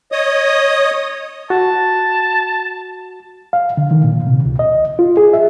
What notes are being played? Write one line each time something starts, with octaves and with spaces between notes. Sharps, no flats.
C#5 D#5 D#6
F#4 A5
F5
D3
D#3
A#2
C3
C#2
D#5
F4
G#4
E5